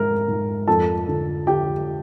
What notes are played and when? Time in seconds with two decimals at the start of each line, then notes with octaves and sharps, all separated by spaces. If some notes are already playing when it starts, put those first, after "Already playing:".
Already playing: G#2 A#4 A#5
0.28 G#2
0.67 F2 A4 A5
1.08 D3
1.47 D3 G4 G5